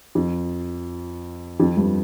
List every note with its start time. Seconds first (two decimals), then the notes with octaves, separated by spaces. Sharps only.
0.15 F2
1.60 F2
1.77 G2